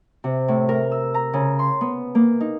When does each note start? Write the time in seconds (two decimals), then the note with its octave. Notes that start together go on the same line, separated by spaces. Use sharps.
0.24 C3
0.48 A2
0.69 A#4
0.91 E6
1.14 A#5
1.33 C#3
1.59 C6
1.81 B3
2.15 A#3
2.40 D#4